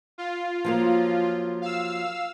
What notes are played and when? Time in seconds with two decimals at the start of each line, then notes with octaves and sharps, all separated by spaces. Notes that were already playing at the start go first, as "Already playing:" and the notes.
0.18 F4
0.65 F3 F#3 A#3
1.62 F5 E6